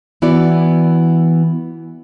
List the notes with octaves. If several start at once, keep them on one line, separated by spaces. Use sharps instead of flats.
E3 B3 E4 F#4 D5